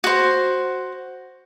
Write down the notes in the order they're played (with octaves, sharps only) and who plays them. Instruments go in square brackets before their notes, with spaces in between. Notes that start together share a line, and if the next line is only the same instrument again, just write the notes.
[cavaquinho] F#4 C5